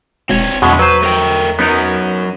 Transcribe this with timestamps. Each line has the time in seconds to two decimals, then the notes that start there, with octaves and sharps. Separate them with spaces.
0.29 E1 C4 C#5
0.62 E2 B2 D3 F#3 G#3 A3
0.79 F#3 B4 C5
1.02 A3 A#4 G5
1.59 F#2 F#3 B3 D#4 A#4